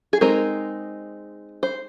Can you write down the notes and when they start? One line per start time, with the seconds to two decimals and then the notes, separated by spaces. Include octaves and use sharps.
0.13 G#4
0.21 G#3 C4 D#4 A#4
1.63 C5